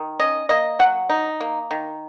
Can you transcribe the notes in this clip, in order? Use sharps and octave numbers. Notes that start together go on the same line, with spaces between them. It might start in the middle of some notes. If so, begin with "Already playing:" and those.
Already playing: D#3
C#4 D#5
A#3 D#5
F#3 F#5
D#4
A#3
D#3